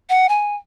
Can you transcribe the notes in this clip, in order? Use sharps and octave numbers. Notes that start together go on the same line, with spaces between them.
F#5
G#5